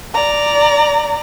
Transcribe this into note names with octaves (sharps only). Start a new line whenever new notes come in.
D5 A#5